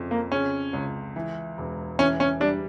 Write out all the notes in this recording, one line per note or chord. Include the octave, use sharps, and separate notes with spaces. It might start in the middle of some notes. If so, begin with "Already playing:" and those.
Already playing: F2 C#3
A#3
C#3 C#4
C#2
E3
E1
E3 C#4
C#4
G3 D4